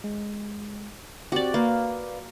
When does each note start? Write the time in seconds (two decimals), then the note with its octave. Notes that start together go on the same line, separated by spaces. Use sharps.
0.04 G#3
1.32 C4 F#4 G4 D5
1.54 A#3 B4 D5 F5